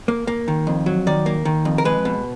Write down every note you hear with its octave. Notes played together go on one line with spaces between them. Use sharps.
A#3
A#3
D#3
F2
F#3
D#3 D5
A#3
D#3
F2
A#4
G#3 B4
B2